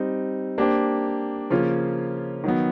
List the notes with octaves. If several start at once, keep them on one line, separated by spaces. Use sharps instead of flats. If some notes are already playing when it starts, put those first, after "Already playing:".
Already playing: G3 C4 D#4
A#3 D4 G4 C5
C#3 F3 A#3 C#4 F4
D#3 F#3 B3